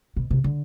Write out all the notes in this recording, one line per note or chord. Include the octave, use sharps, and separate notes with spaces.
B2
C3
D3